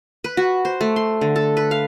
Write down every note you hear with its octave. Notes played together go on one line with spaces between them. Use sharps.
B4
F#4
C5
A3
C6
D3
A4
B4
F5